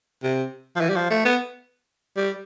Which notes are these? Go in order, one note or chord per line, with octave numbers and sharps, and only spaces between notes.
C3
F3
E3
G3
F3
A3
B3
G3